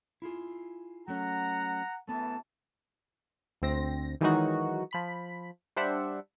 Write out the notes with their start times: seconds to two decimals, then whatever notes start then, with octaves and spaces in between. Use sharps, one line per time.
0.22 E4 F4 G#4
1.08 F#3 A3 C#4 F#5 A#5
2.08 F#2 E3 A3 B3 A5
3.62 D2 C4 A#6
4.21 D#3 E3 F#3 G#3 D#4 F#4
4.91 F3 B5 B6
5.76 G3 D4 C5 D5 E5 F#5